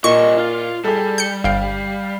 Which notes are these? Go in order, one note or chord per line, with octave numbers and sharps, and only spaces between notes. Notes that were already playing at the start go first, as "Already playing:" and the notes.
C2 A#2 D#5 C#6
F4
G3 G#4 A4
G6 C#7
G1 F5 G5